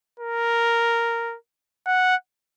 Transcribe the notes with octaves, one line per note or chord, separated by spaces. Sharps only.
A#4
F#5